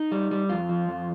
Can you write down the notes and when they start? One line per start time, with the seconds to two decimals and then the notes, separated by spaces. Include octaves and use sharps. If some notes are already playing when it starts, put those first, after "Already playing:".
Already playing: D#4
0.12 G3
0.31 G3
0.49 F2 F4
0.69 F3
0.88 F2